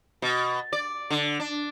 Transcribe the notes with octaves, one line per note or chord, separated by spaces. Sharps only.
B2
D5
D3
D4